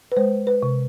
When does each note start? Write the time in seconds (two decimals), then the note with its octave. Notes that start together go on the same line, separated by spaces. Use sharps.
0.12 B4
0.17 G#3 C5
0.47 B4
0.63 C3